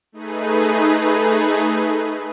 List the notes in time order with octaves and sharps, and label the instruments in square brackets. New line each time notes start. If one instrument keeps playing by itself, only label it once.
[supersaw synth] A3 D#4 G#4 B4